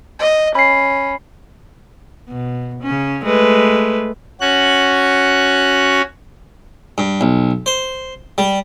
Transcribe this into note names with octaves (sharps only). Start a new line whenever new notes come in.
D#5
C#4 B5 C7
B2
C#3 C#4
G#3 A3 B4
C#4 F#4 F#6
G2
B1
C5
G3